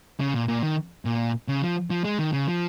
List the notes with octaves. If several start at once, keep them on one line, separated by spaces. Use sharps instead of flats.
C#3
A#2
A#2
D#3
A#2
C#3
F3
F3
G#3
D#3
C#3
F3